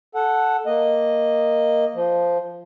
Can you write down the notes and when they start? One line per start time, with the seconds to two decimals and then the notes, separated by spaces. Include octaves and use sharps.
0.15 A4 F#5
0.66 A#3 D#5
1.95 F3